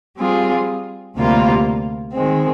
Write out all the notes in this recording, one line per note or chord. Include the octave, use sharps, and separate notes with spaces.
G3 C4 F4 G#4
D2 C3 G3 A#3 F4
D#3 G#3 C4